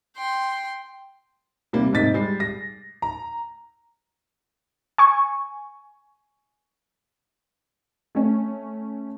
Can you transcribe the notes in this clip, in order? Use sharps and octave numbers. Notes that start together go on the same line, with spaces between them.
G5 C6
C3 G3 A#3
G#2 C3 D#5 A6 B6
G3 G#3 C7
A#6
A#5
G#5 C#6
A3 C#4